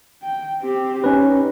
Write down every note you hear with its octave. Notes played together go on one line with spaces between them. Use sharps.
G5
C4 G4
C#4 D#4 B4